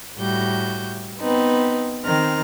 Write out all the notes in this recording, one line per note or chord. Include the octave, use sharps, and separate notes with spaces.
A2 G3 F#4 G6
B3 C4 D#4 B4
D#3 C4 F6